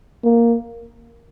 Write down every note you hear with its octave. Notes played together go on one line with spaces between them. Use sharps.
A#3